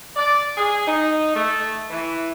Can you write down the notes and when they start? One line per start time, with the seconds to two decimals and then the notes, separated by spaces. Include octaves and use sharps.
0.16 D5
0.56 G#4
0.87 D#4
1.35 A3
1.90 E3